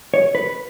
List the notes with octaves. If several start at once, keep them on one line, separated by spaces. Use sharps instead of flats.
C#5
B4